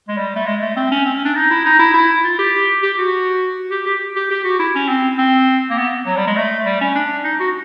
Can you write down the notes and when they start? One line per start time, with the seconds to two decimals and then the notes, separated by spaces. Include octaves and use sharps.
0.08 G#3
0.17 G3
0.36 A3
0.46 G#3
0.62 A3
0.77 C4
0.92 C#4
1.06 C4
1.16 C#4
1.25 D4
1.35 D#4
1.51 E4
1.66 D#4
1.79 E4
1.94 E4
2.24 F4
2.39 G4
2.83 G4
2.98 F#4
3.71 G4
3.86 G4
4.16 G4
4.31 G4
4.45 F#4
4.59 E4
4.75 C#4
4.89 C4
5.18 C4
5.70 A#3
5.78 B3
6.07 F#3
6.16 G3
6.27 G#3
6.37 A3
6.66 G3
6.81 C#4
6.96 D4
7.25 D#4
7.40 F#4